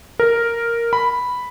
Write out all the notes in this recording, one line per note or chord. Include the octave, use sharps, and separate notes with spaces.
A#4
B5